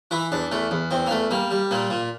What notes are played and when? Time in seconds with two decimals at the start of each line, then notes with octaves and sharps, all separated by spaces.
0.11 E3 E4
0.32 E2 D4
0.52 E2 A3
0.71 E2
0.91 E2 C4
1.06 A#3
1.11 E2 A3
1.31 G3 A#3
1.51 G3
1.71 A#2 A#3
1.90 A#2